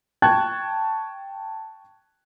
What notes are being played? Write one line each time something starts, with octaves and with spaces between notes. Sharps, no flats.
G5 A5 C#6 F#6 G#6